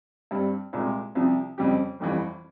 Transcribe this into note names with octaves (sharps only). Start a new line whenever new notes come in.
G2 G3 C4
C2 A#2 G#3
C2 C3 F3
F2 C#3 G3 C4 G4
G1 F2 E3 G3